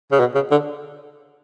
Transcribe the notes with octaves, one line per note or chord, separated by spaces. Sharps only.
C#3
B2
C#3
D3